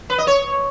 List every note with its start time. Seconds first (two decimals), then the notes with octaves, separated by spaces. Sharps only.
0.10 B4
0.18 D#5
0.27 C#5